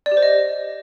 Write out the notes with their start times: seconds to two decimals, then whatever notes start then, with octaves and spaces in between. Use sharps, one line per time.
0.06 D5
0.12 G4
0.17 C5
0.23 D#5